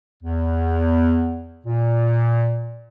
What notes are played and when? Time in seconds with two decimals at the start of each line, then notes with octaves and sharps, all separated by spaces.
0.23 E2
1.66 A#2